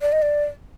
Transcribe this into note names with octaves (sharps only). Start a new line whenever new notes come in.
D5
D#5
D5